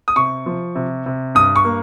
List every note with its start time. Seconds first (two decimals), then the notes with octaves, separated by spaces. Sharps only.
0.08 D#6
0.16 C3 C#6
0.46 F3
0.75 C3
1.06 C3
1.35 G2 D#6
1.56 C#6
1.65 A#3